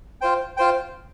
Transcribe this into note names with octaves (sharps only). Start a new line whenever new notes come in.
F4 C5 G5
F4 C5 G5